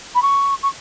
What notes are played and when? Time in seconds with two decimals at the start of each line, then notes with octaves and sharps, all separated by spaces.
0.15 B5
0.22 C#6
0.62 C#6